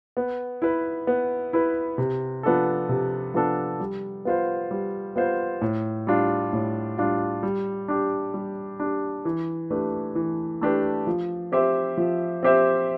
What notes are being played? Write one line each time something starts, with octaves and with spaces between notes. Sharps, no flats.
B3
E4 B4
B3
E4 B4
C3
F3 B3 D4 A4
C3
F3 B3 D4 A4
G3
B3 F4 C5
G3
B3 F4 C5
A2
G3 D4 F4
A2
G3 D4 F4
G3
D4 G4
G3
D4 G4
E3
A3 D4 G4 B4
E3
A3 D4 G4 B4
F3
C4 G4 C5 E5
F3
C4 G4 C5 E5